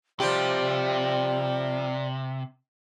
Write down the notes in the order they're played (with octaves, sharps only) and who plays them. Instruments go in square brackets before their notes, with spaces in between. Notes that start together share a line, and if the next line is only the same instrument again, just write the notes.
[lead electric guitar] C3 [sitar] F3 G3 G4 [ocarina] D5